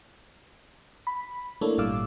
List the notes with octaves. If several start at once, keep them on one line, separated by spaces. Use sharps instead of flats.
B5
A3 A#3 D4 E4 A4 C#5
G#1 A#2 G3 F5 D6 E6